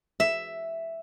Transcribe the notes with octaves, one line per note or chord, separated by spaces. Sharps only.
E5